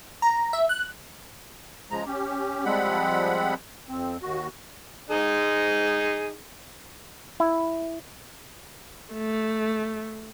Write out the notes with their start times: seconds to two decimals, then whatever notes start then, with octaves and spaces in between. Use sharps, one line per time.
0.22 A#5
0.53 E5
0.69 F#6
1.91 C#3 F3 G#3 A#5
2.06 C#4 G4
2.65 F3 G3 G#3 C4 F#5 B5
3.89 F2 C4
4.22 D#2 F#4
5.10 D#4 G#4
7.40 E4
9.14 A3